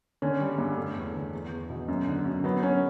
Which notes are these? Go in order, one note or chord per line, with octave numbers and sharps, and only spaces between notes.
D3 C#4
G3
G2
A3
E2
D3
E2
E2
B2
F#2
D3
F#2
F#3 B3
F#3 C#4